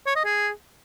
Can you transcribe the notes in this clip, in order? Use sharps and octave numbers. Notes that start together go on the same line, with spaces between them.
C#5
D#5
G#4